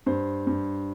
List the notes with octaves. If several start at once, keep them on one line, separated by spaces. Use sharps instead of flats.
G2 C5
G2